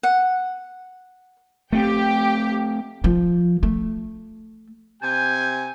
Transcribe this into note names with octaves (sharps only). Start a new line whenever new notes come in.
F#5
A3 C4 G4 G5
F3
A3
C3 G#5 G6